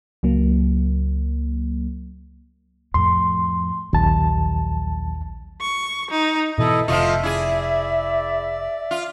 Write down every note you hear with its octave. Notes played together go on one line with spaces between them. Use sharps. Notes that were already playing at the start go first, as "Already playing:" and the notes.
C#2 F#3 A#3
F2 A2 C6
A#1 D#2 F#3 A5
C#6
D#4
G#2 B2 E3 E4 A4 D#5
F1 C3 F3 A3 F4 D#5 E5
E4 G#4 D5
F4